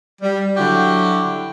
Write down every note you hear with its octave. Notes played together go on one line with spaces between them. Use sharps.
G3
D3 F#3 E4 F#4 G4